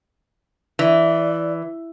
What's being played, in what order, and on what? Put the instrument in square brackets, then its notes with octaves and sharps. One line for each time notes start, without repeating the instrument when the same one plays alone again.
[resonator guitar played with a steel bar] E3 [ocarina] D5